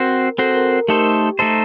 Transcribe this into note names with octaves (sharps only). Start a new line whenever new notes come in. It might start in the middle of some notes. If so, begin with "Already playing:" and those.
Already playing: C4 F#4 A#4 C5
C4 F#4 A4 C5
A#4
A#4
A3 D#4 G4 A4 C5
A3 D#4 A4 C5 D#5